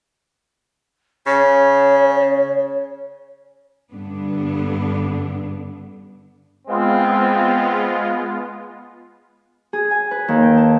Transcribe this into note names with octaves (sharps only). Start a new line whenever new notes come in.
C#3 C#5
G2 D3 B3 D4
G#3 B3 C4 F4
G#4
G#5
B4
D#2
G5
A5